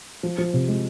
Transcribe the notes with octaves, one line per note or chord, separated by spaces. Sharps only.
F3
F3
C3
G#3